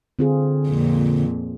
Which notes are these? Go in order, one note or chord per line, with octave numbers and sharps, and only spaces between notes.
D3 C4 F4 G#4
F2 A#2